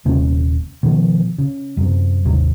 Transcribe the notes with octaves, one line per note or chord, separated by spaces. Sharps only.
D#1 C3 A#3 C#4
B2 D#3 F3
C#3
F#2 C3
G#1 D#2 C3 F#3